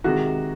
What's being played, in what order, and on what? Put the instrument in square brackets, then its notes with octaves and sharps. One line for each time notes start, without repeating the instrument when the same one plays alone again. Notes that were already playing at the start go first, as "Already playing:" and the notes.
[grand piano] C3 D#3 G#3 F#4